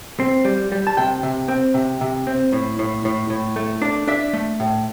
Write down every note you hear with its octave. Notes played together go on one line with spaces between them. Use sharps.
C4
G3
G3
A5
C3 G5
C3
C4
C3
C3
C4
A2
A2
A2
A2
A3
D4
D4 E5
A3
A2